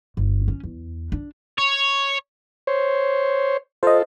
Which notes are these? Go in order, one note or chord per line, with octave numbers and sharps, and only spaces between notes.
G1
C#4
E2
D4
C#5
C5 C#5
F4 A4 C5 D#5